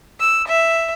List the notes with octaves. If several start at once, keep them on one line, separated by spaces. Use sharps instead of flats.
E6
E5